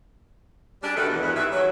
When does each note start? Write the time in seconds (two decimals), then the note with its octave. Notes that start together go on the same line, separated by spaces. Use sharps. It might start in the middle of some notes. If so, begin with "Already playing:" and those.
0.83 G3 D4 G#4
0.95 B2 D3 D#3 A3 F#4 B4
1.09 E2
1.22 E2 G2 F#5
1.35 D#3 E3 E5
1.50 F#3